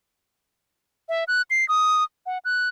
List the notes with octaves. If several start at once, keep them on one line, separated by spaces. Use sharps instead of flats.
E5
F#6
C7
D#6
F#5
F#6